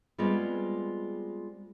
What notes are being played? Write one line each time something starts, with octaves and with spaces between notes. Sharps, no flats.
G3 G#3 B3 C4 F4 G#4